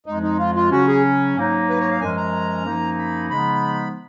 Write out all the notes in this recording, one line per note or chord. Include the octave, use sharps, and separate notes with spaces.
F2 F3 G#3 D#4
D#4
F4
F4
C#3 F#3 C#4 F#4
G#4
G#2 F#3 A#3 D#4
B4
C#5
F5
F#2 F3 G#3 C#4 G#5
A#5
F#2 F3 A#3 D#4
B5
C#3 F3 G#3 B3 D#4 B5